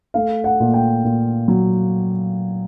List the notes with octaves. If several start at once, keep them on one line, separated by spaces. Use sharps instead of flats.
A3 F5
F#5
A#2
G5
A#2
F#3